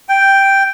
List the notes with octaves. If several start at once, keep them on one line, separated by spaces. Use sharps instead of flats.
G5